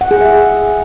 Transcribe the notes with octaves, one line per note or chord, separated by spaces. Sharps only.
F#5
G#4
E5